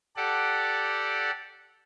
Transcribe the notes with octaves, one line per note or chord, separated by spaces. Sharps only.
G4 A4 D5 F#5